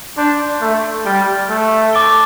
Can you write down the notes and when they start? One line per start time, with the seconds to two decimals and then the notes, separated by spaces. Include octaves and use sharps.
0.18 D4 C6 G6 D7
0.62 A3
1.05 G3 F6 A6 D7 G7
1.49 A3
1.93 A5 D6 A6 D7 G7